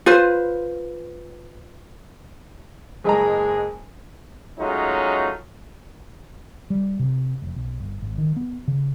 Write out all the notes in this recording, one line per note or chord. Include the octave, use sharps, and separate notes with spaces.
F4 B4 C5
F#1 G#3 G#4 A#5
F#3 G#3 A3 C#4 D#4 F4
G3
C3
F1
B1
G1
G#1
D#3
B3
C#3